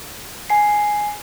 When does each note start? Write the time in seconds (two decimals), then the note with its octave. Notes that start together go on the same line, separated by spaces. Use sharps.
0.50 G#5 C7